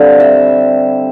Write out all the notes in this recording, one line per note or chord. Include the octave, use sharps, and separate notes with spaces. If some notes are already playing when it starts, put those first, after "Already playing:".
Already playing: D3 G3 C4 F5
E5